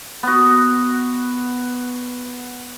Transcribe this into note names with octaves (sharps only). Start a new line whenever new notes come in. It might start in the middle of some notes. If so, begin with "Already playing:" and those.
B3 F#4